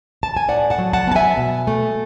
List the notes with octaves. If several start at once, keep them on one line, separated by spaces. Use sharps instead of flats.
A5
G#5
A2 D5 F#5
F#5 A5
F#3
F#5 A5
B3 A5
E5 G#5
B2
A3